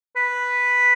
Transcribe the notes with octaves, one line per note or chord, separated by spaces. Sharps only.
B4